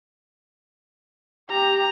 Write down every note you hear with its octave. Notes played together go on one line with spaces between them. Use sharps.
G4 A#5